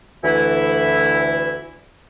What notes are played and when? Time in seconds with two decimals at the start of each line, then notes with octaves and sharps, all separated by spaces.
0.24 D2 E3 E4